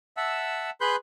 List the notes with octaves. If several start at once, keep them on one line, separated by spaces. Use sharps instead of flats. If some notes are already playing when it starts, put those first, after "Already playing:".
E5 F#5 A5 E6
G#4 B4 B5 C6 F#6 G6